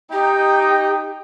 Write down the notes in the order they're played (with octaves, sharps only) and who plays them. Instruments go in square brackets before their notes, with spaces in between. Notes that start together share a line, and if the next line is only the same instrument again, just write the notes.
[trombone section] D#4 [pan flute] G4 [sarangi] G5